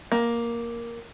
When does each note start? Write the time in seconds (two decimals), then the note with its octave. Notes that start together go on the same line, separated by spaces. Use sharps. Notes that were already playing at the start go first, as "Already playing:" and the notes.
0.12 A#3